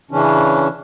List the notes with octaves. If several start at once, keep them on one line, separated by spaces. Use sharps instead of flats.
C#3 E3 C#4 D4